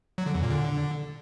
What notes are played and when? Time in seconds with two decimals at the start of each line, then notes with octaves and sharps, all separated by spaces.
0.18 F#3
0.26 D3
0.34 E2
0.43 A#2
0.51 D3